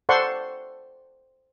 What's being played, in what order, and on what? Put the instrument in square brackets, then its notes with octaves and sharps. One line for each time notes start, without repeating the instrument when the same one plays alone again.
[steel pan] A4 C5 D5 F#5 C6 C#6